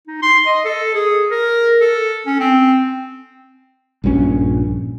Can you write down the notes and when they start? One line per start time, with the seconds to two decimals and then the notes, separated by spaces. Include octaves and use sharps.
0.07 D#4
0.22 C6
0.46 D#5
0.65 A4
0.95 G#4
1.31 A#4
1.81 A4
2.27 C#4
2.40 C4
4.04 A#1 G2 F3 C#4